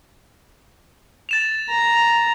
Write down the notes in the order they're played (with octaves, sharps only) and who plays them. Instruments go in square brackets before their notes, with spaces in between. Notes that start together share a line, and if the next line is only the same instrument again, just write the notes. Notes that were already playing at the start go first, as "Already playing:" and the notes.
[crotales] A6 E7 F7
[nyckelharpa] A#5